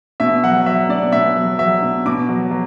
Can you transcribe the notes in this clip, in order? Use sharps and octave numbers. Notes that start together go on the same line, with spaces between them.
B2 E5
F#3 F#5
F#3 E5
B2 D5
B2 E5
F#3
F#3 E5
B2
B2 D6
F#3
F#3